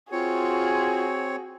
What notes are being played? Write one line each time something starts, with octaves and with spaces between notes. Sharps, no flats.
C4 F4 F#4 G#4 C#5